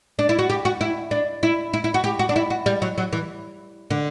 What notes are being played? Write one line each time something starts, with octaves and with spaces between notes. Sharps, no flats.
D4
E4
F#4
G4
F#4
E4
D4
E4
E4
E4
F#4
G4
F#4
D4
E4
F#4
G3
F#3
F#3
E3
D3